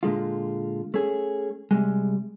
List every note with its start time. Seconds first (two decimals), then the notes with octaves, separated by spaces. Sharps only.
0.03 A#2 D3 G#3 F4
0.94 A3 C#4 G#4
1.71 C3 G3 G#3